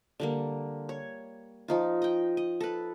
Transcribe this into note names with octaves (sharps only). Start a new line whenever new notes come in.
D3 G3 A#3
C#5
F3 D#4 F4
D#5 G5
D#5
A4 B4